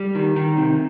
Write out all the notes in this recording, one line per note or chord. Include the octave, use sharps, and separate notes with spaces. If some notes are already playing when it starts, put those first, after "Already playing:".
Already playing: G3
D#3
D#3
C3